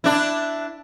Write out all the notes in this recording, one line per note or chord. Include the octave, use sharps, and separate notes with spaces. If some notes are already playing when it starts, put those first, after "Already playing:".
D4 E4